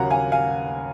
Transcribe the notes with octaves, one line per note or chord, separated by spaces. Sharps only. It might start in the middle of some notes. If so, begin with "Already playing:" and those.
Already playing: D#2 C#3 F#3 A#3 F#5 A#5
F5 G#5
F5 G#5